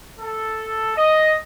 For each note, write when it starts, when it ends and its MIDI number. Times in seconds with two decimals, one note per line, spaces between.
0.19 0.95 69
0.97 1.36 75